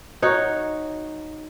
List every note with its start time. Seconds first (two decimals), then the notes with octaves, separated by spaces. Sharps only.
0.22 D#4 F#4 C#5